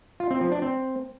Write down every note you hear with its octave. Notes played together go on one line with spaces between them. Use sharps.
F4
C4
F3
D4
C4